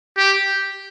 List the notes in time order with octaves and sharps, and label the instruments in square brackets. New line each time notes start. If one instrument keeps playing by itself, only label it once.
[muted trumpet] G4